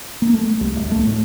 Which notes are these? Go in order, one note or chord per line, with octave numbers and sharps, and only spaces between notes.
A#3
A3
C2
D1
A3
A2